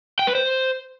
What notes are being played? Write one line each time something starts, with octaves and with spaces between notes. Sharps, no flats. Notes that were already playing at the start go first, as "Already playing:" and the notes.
G5
B4
C5